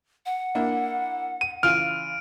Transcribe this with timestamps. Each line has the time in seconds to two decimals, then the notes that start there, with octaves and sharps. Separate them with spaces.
0.26 F#5
0.55 A#3 D4 E4
1.41 D#7
1.63 C#3 E3 F4 F6 D7 D#7